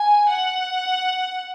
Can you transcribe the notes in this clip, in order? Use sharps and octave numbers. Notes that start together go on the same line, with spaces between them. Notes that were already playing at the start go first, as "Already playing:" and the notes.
Already playing: G#5
F#5